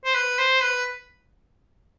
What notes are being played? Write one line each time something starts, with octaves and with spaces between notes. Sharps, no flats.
C5
B4
C5
B4